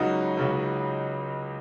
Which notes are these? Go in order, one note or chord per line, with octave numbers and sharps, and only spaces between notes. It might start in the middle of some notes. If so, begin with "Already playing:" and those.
Already playing: C#2 C#3 F#3 D#4
C#2 C#3 F#3